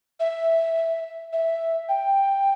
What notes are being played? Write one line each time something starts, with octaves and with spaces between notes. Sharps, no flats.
E5
E5
G5